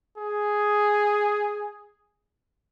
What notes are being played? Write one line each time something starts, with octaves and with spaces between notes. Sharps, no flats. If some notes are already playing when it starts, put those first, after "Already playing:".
G#4